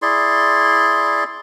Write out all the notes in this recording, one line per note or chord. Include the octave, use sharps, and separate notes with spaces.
E4 G#4 D5 C6